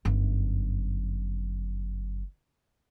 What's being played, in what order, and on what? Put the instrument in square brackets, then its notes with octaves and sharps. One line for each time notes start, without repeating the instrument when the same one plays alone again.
[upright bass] G1 F#2